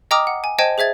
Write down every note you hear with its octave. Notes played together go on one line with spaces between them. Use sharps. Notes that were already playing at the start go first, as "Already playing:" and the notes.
D#5 G5 A#5 D6 D#6 F6
F#5
G#5
C5 D#5 G5 A5 G#6 D#7
G#4 C5 E5 G#6 A6